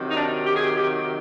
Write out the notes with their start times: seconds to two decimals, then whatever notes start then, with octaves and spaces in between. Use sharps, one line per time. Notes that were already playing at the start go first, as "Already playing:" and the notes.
Already playing: C3 D#3 F#3
0.10 D#4
0.17 D4
0.46 G4
0.56 G#4
0.64 G4
0.77 G4